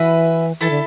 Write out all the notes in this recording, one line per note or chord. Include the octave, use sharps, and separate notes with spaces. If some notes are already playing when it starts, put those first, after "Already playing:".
Already playing: E3 F#4 B4 E5
E3 E4 A4 E5 A5
D3